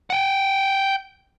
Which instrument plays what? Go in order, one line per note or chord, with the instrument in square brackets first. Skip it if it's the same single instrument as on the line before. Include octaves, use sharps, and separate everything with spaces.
[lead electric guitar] F#5 G5